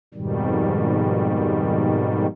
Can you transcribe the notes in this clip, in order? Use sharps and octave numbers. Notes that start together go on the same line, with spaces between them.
F2 G#2 B2 D#3 G3